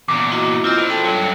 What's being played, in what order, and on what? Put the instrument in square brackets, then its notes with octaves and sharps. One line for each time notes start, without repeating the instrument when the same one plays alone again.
[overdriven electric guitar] E2 A#2 [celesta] D6
[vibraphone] E4 F#4 D#5
[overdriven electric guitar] C4 [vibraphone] F4 D#5
[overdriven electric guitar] A#4 C5
[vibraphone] A4 G5 A5
[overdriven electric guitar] G2 F#3